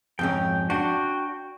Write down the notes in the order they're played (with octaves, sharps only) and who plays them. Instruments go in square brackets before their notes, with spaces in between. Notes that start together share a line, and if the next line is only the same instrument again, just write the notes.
[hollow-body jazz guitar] F2 G#2 C#4 [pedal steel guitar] G5
[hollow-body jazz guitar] D4 [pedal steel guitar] F#4 G5